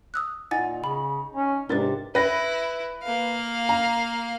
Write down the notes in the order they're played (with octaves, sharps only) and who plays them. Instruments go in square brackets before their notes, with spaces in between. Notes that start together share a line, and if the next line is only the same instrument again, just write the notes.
[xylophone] D#6 E6 F#6
[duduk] A#2 [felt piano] D#4 [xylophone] F#5 G#5 A6
[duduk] C#3 [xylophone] B5
[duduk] C#4
[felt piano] G#2 D4 A6 [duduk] C3 [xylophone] A#4 B4
[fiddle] E4 [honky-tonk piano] B4 A#6
[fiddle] A#3 F5
[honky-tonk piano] A#5